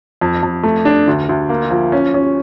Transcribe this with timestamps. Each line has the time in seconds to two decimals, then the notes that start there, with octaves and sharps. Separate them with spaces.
0.21 F2
0.43 F2
0.63 A3
0.85 D4
1.08 D2
1.29 D2
1.49 A#3
1.71 F3
1.92 C#4
2.14 C#4